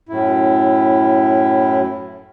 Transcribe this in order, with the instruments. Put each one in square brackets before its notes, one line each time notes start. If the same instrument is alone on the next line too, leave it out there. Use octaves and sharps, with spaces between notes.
[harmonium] F#2 A2 E4